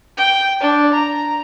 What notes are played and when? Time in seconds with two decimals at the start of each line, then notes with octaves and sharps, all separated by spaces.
0.17 G5
0.61 D4
0.94 A#5